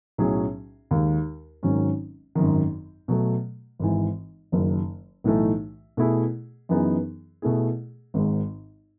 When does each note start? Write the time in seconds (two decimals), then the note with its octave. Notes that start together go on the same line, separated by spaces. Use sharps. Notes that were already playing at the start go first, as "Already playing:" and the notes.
0.18 B1 A2 F#3 C#4 G#4
0.91 D#2 D#3 G#3
1.63 G#1 G#2 D#3 F#3 C#4
2.35 G#1 F#2 D#3
3.08 B2 F#3 A3
3.79 G#1 G#2 E3
4.52 F#1 F#2 D#3 F#3
5.24 B1 A2 E3 A3 D#4
5.97 B2 A3 E4 G#4
6.69 F#2 E3 B3 D#4 G#4
7.42 B2 A3 E4 G#4
8.14 G#1 G#2 D#3 G#3